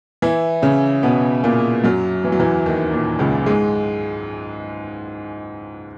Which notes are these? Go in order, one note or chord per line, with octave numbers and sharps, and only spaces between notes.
E3 E4
C#3 C#4
B2 B3
A#2 A#3
F#2 F#3
E3
F#3
E2 E3
D#2 D#3
A#2
C#2 C#3
G#2 G#3